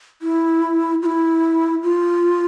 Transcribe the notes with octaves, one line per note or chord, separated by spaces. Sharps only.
E4
F4
E4
F4